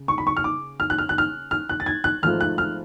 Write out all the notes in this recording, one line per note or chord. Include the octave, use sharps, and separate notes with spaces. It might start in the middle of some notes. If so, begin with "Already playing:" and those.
Already playing: C#3
C#6
B5
C#6
F6
D6
F6
F#6
F6
F#6
F6
F6
F#6
A6
G#6
F#6
G#1 G#2 F3 A3 F4 F6
F#6
F6